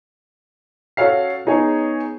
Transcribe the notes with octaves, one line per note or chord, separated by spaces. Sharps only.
C#4 F#4 A4 C#5 F5 C7
B3 C#4 D#4 G#4 C#5